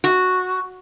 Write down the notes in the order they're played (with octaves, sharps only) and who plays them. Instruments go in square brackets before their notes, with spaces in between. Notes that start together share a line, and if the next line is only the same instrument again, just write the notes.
[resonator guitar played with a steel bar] F#4